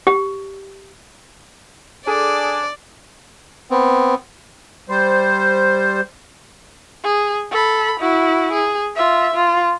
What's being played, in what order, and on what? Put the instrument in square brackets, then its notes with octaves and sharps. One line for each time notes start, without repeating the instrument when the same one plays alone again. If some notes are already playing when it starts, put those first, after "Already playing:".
[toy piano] G4
[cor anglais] D4 [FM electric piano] G#4 A4 D#6 [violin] D5 [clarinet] G#5
[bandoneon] B3 C4
[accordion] G3 C5
[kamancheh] G#4
A4 B5
E4 F#4
G#4
F4 E5
F4